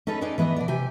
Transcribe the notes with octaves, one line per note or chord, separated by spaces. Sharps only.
C#4 D#4 G#4 A4 B4
C#4 D#4 G#4 B4 D5
E3 B3 B4 C5 D#5
B2 D5
C3 G4 G#5